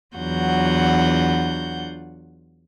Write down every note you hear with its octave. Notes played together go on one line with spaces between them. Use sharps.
E2 F#3 D4 F4 F#5 G6